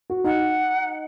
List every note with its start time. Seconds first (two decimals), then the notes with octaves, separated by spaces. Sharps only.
0.10 F#4
0.24 D#4 F#5